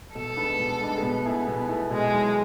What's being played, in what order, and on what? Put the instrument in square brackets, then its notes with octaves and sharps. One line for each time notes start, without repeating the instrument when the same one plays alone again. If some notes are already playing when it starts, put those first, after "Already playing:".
[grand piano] B2 [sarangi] A4
[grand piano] G#3 B3 D4
B2
G#3 B3 D4
[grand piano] B2 [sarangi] B3
[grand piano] A3 E4 G#4
B2
A3 E4 G#4
[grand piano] B2 [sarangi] G#3
[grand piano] F#3 A3 E4